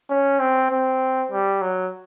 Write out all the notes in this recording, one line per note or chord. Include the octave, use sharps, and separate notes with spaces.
C#4
C4
C4
G3
F#3